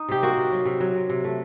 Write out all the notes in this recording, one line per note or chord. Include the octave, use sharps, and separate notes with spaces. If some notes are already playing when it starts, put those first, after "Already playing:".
Already playing: D#4
C3 G4
A#3 F#4
C3
F#3
C3
F#3
C3
C3
A3